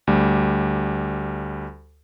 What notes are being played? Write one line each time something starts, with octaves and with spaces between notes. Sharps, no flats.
D2 G3